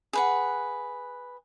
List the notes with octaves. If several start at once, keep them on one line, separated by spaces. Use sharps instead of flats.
G#4 B4 F#5